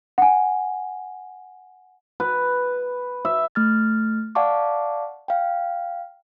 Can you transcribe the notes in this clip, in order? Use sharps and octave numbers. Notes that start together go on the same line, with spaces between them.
F#5 G#5
B4
E5
A3 F6 A6
D5 F5 F#5 A5 C#6 D6
F5 G5